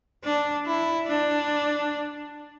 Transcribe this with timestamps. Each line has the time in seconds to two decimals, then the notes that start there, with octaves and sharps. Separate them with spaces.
0.24 D4
0.66 E4
1.07 D4